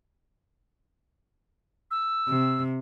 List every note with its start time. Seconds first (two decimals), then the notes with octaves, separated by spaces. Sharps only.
1.91 E6
2.28 C3